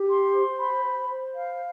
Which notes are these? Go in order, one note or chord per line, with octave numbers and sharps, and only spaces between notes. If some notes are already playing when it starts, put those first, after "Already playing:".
Already playing: G4
C6
C5
B5
C5
C5
F5